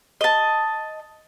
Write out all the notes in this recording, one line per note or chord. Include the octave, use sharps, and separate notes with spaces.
D#5 A5